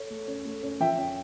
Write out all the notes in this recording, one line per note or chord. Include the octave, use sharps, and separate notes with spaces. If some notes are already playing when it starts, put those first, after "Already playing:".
Already playing: A4 C#5
A3
C#4
A3
C#4
F3 E5 G5
C#4